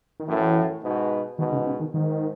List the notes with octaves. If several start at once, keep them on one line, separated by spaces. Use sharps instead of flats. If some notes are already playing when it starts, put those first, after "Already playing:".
D#3
F#2 A2 E3
G#2 B2
G#2 B2 D#3
C#3
C#3
D#3
G#2 D#3